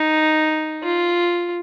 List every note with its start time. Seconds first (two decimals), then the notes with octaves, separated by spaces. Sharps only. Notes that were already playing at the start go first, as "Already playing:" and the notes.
Already playing: D#4
0.83 F4